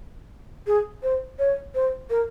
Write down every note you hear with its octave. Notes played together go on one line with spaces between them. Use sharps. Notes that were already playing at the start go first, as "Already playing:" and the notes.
G#4
C5
C#5
C5
A#4